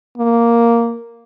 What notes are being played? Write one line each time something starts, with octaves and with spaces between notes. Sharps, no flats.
A#3